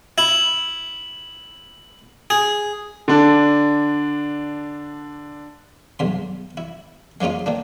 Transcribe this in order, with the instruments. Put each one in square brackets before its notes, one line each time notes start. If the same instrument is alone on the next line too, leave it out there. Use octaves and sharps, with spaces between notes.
[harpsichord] E4
G#4
[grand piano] D3 D4
[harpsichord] B1 G2 C6
E4
G#3 A#3 C#4 D#4 F4
D#3 A#3 D4